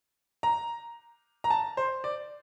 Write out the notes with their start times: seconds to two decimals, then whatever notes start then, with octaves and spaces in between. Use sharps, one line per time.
0.43 A#5
1.44 A#5
1.50 A5
1.77 C5
2.04 D5